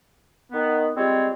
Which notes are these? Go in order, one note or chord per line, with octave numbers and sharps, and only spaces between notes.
D#3 B3
G3 G#3 C4 F4 C#5